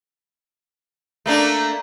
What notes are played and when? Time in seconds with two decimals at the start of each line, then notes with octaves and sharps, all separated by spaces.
1.26 A3 A#3 D4